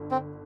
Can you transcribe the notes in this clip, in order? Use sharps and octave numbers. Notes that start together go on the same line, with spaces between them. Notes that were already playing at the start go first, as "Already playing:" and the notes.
Already playing: G1 D3
C4